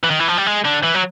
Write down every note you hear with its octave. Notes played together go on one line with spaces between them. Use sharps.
E3
D#3
E3
F3
G3
G#3
D3
E3
F#3